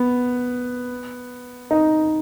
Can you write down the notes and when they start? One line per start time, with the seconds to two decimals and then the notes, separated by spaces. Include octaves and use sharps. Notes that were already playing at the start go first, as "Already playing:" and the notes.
Already playing: B3
1.71 D#4